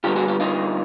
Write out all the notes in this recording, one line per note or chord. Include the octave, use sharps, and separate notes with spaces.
D3 G3 B3 F4 G4
F#4 G#4
F4 G4
D#4 F4